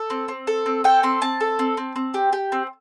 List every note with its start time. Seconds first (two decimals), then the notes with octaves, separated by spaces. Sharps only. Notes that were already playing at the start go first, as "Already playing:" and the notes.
Already playing: A4
0.10 C4
0.28 C4
0.47 A4
0.66 C4
0.84 A4 G5
1.03 C4 C6
1.21 C4 A5
1.41 A4
1.59 C4
1.77 C4
1.96 C4
2.14 G4
2.33 G4
2.52 C4